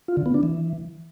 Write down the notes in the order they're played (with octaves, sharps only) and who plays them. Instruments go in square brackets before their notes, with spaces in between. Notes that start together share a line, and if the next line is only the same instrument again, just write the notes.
[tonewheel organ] F4
D3
B3
D4
E3